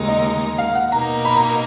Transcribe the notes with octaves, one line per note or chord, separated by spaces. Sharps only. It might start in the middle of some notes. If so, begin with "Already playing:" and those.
Already playing: D#2 C#3 G#3 D#4 A#4
D#5
F5
F#5
B2 A#3 D#4 A#5
B5
A#5